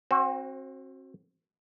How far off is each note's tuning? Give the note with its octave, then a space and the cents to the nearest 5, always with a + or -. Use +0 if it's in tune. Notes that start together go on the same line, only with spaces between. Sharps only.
C4 +35 F#4 +0 C5 +0